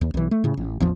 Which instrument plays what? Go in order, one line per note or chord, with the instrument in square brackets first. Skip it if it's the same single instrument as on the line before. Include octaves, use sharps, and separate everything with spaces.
[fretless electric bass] D#2
B1 E3
A3
A2 C#3
A1
A1 E2 F3